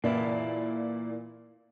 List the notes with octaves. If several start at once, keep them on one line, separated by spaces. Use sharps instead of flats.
A#2 E3 A#3 E4 D5